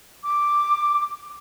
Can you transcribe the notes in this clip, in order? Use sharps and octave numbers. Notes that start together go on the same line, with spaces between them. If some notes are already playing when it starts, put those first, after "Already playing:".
D6